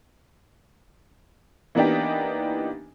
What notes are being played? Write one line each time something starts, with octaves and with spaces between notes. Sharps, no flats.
E3 A#3 B3 D4 D#4 G4